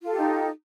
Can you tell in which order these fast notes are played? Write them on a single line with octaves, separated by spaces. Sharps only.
F4 A4 G4 D#4